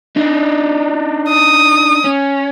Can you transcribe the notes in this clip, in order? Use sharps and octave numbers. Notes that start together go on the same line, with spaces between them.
D4 D#4
D#6
C#4